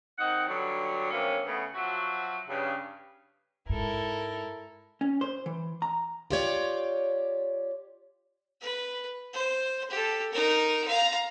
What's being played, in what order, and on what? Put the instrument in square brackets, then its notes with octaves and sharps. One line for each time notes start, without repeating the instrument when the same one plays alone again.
[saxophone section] D#3 C4 D#4 F#5
G2 D3 F#3
G2 C3 F#3 A#3 C#4
C#3 A3 B3
F3 F#3 F#4 E5
G2 C#3
[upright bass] G#2 [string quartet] E4 A4 A#4
[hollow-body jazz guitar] C#4
C5
E3
A#5
[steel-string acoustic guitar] F4 G4 C#5 D5
[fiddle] B4
C5
G4 A4
D#4 A#4
F5 A#5